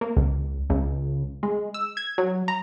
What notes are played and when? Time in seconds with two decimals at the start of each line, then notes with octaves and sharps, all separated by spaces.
0.01 A#3
0.17 C#2
0.70 C#2
1.43 G#3
1.74 E6
1.97 G#6
2.18 F#3
2.48 A#5